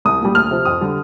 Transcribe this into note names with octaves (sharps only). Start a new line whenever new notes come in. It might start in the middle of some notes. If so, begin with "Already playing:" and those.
C2 D#6
A#2 G3
D2 F6
C3 F3
F2 D#6
D3 G3